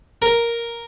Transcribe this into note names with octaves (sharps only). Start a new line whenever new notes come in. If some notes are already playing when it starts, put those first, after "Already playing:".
A#4